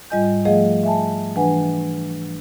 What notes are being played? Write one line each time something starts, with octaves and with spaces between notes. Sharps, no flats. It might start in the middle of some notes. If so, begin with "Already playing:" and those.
G#2 G3 F4 D#5 G#5 G6
F3 A3 G#4 D#5 F5 F#5
E5 G#5 A5
E3 D4 B4 F#5 G#5